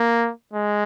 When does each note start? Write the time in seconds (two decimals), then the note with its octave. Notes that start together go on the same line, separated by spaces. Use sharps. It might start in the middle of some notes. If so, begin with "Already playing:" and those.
Already playing: A#3
0.54 G#3